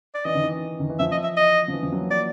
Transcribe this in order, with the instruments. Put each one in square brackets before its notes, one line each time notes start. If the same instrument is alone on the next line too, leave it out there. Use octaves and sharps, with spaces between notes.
[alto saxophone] D5
[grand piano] E3 [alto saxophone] D#5
[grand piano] D#3
E3
D#3
E3
[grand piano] F3 [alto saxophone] E5
[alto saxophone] D#5
E5
D#5
[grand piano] F3
E3
F3
F#3
A#3
[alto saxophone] D5